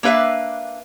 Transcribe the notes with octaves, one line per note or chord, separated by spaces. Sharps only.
A#3 D4 B4 E5 F5